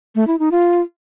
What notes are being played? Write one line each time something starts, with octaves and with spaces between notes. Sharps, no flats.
A3
E4
D#4
F4